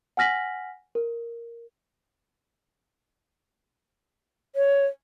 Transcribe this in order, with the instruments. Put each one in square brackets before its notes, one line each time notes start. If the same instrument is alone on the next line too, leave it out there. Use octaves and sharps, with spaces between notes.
[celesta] F#5 G#5 F6 A#6 B6 F#7
A#4
[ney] C#5